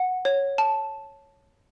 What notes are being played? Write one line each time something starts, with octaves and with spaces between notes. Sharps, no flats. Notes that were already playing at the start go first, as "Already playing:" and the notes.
Already playing: F#5
C#5
A5